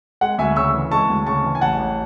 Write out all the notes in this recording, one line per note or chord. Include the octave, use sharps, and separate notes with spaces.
G#3 F#5
D2 E5 G#5
C#3 C#6 E6
E3
G#3 A5 C#6
D2
C#3 A5 C#6
E3
G#5
A1 F#5 A5
A1